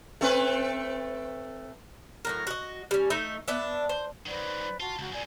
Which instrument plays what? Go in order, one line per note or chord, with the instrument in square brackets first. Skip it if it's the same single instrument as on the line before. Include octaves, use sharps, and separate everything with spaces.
[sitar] A3 C4 B4
[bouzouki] A2 F#3 A#4
F#4 D#5
G3 C#4
A3 D#4 D#5 E5
B3 D4 E5
C5
[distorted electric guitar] D#3 F#3 [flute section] B4 C5 D5
[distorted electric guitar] F4 [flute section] F#4 A5
[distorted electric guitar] C#2 [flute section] F#4
[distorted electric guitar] C2 A#2 [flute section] D5 G#5